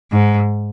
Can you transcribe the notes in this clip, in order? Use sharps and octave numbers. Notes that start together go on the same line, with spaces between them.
G#2